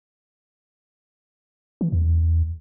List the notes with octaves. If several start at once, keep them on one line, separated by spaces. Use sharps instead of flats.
E3
E2